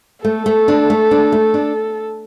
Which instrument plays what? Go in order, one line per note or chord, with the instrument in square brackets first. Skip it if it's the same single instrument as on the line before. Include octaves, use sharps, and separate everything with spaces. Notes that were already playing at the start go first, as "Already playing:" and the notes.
[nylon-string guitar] A3 [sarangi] A4
[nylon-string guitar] A3
D4
A3
D4
A3
D4